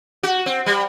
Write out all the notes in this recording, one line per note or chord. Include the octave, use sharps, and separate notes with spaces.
F#4
C4
G3